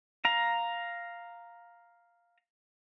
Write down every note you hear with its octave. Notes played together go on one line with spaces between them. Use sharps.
F5 A#5